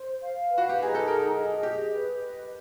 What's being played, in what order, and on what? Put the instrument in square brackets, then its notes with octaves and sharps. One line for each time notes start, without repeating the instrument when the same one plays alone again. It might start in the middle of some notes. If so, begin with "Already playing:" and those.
Already playing: [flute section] C5
F5
B4
[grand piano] F#4
G4
[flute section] D#4 [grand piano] G#4
[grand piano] A4
[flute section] G#4 [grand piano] A#4
[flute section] D#5
[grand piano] G4 [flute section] G#4
[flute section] B4
D#5